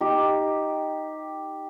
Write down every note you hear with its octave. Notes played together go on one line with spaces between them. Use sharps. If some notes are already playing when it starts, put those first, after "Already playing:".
D#4 G4